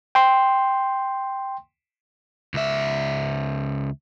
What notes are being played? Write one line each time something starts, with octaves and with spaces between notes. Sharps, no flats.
G5 C6
C#2 E5